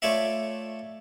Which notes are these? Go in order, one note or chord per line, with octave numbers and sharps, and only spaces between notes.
A3 F4 C#5 D5 E5